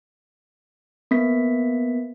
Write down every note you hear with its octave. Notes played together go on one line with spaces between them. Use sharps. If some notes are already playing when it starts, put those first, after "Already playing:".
A#3 B3 B6